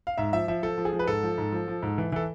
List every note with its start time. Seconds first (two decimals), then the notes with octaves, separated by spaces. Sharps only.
0.07 F5
0.18 G#2 E5
0.33 F3 E5
0.48 F3 E5
0.63 F3 A4
0.78 F3
0.85 G#4
0.93 F3
0.99 B4
1.07 G#2 A4
1.23 F3
1.38 G#2
1.52 F3
1.68 F3
1.83 G#2
1.98 E3
2.12 E3 A4